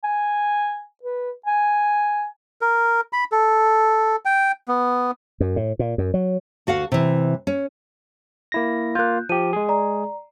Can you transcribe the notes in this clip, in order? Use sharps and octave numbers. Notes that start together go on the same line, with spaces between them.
G#5
B4
G#5
A#4
B5
A4
G5
B3
F#2
A2
A#2
F#2
F#3
D2 F#4 F5 F#5
C3 E3
C#4
A#3 E4 A#6
A#3 F4 F#6 G6
F3 G4 D#7
G#3 G#4
D5 A#5